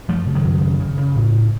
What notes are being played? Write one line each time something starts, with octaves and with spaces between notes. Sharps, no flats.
F#2 F3 A3
C#3
D#3 F#3
F#2
C#3
C#3
C#3
A2
A2